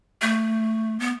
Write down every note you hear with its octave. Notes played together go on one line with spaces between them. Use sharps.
A3
B3